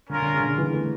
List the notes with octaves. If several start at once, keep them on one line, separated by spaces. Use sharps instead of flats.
D3 C#4 F4 A#4
D3
C#3
D3
C#3
E3
A3